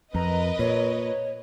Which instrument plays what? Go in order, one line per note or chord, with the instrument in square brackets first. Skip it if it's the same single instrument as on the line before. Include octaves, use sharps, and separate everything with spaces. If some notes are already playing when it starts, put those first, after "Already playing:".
[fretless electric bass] F2 [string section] A#4 B4 D#5 [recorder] A#5
[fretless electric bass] A#2 [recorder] C#5